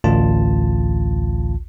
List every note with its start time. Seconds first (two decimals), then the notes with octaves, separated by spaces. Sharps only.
0.04 A1 D2 F4 A5